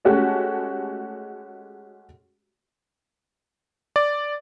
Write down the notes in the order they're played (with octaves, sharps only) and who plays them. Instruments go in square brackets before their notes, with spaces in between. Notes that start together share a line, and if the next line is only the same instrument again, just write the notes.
[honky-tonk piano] G#3 A3 C#4 F#4 G4
[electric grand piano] D5